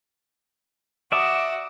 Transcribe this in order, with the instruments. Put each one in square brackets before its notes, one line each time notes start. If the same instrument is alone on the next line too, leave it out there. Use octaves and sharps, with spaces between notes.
[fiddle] F#4 [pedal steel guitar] D5 E5 [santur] A#5 D6 D#6